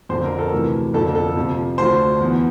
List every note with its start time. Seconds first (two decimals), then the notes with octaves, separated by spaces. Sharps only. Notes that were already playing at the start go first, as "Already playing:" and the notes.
0.09 F2 D3 F3 C5
0.24 A#4
0.34 A#4
0.39 A4
0.52 D2 C3 E3
0.94 F2 D3 F3 A4
1.15 A4
1.36 F2 C3 F3
1.78 D2 D3 F3 C5
2.20 E2 E3